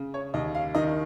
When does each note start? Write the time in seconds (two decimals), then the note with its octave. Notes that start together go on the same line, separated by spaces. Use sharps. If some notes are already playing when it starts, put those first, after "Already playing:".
Already playing: C#3
0.14 C#5
0.34 D#2 D#5
0.55 F5
0.75 D#3 D#5